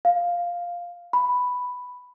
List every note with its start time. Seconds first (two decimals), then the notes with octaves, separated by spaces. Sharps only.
0.05 F5
1.13 B5